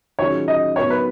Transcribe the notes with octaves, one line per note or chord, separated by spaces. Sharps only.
D#3 F#3 C#4 F4 G#4 C#5
D#5
F#3 B3 D#4 A#4 C#5
B4